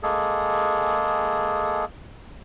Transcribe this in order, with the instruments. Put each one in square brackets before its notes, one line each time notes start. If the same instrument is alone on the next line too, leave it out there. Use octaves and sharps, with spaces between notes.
[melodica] G#3 A#3 G#4 A4